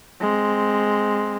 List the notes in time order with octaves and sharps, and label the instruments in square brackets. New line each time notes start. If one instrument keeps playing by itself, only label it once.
[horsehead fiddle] G#3 C4